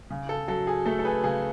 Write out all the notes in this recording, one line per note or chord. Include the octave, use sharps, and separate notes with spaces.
C#3
A4
F#3 A4
G#4
A3 A4
A4
G#4 B4
C#3 G#4 B4